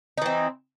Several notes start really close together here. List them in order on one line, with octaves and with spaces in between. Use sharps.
D#4 E3 C4